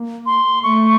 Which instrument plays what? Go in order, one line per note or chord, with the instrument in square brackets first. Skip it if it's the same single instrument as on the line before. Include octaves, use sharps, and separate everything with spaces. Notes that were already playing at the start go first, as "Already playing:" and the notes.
Already playing: [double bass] A#3
[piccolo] C6
[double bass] A3 [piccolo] C#6